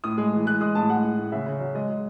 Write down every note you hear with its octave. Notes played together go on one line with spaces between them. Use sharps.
A2 D#6
G#3
E3
G#3 F#6
G#3 D#6
A2 A5
G#3 F#5
A2
A2
C#3 E5
C#3
F#3
G#3 D#5
G#3